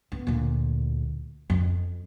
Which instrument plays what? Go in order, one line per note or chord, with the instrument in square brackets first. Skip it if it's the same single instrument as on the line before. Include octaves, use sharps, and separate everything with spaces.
[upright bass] B3
D2 A#2
F2